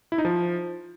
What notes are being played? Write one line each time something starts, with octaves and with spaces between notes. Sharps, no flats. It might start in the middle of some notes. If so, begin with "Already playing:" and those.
E4
D#4
F3